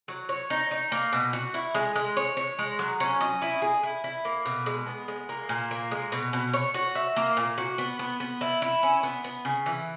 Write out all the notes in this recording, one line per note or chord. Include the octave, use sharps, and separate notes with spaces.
F#3
C#5
D#4
D#4
A#3
B2
F#4
E4
G#3
G#3
C#5
C#5
G#3
F#3
C#4
D#5
E4
G#4
E4
E4
A#3
B2
G#3
B3
G#3
A#3
A#2
A#3
G#3
B2
B2
C#5
F#4
E5
A#3
A#2
F#4
B3
B3
B3
E4
E4
C#4
B3
B3
C#3
E3